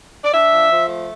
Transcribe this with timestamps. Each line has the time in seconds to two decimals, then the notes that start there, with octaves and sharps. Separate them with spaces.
0.24 D5
0.34 D4 E5
0.52 F3
0.70 F3
0.87 A3